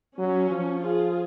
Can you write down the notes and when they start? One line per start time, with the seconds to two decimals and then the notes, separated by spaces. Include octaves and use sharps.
0.18 F#3 C#4
0.50 F3
0.82 F4 G#4